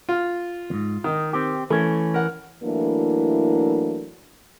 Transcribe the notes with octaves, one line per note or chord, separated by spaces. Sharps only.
F4
E2 G#2
D#3 D#4
C4 G4
E3 A3 C#4
A#4 F#5
E3 F#3 A3 A#3 D4 E4